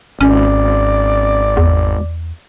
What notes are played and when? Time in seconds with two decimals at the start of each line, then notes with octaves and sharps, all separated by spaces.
0.21 G#1 C#4 D5
1.57 E2